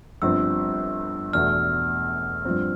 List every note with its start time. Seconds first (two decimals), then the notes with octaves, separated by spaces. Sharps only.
0.22 G1 G2 F3 C4 E6
1.33 E2 B2 A3 D4 F6
2.45 G2 F3 C4